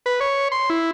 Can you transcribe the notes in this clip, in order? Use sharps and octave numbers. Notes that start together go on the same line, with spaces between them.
B4
C#5
C6
E4